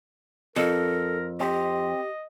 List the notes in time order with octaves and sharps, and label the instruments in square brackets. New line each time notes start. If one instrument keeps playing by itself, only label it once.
[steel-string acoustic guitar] F2 [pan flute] A4 [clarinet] A#4
[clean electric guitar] C4 [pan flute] G4 [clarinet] D#5